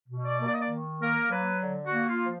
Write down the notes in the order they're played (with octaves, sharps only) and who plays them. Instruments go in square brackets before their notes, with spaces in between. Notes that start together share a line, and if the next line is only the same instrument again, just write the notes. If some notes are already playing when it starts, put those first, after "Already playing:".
[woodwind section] B2
D5
A#3
D5
D#5
D5
D#3
A#3 A#4
F#3 B4
D3
F#4
A#3
F4
F3